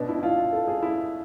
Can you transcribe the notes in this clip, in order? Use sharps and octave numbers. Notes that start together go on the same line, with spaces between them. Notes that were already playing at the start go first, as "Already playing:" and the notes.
Already playing: B2 D4
E4
E4
F4
A4
G#4
E4